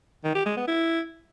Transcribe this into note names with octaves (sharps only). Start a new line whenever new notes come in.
D#3
G4
G#3
B3
E4